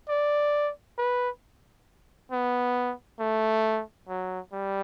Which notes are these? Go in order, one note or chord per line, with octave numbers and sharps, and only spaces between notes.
D5
B4
B3
A3
F#3
G3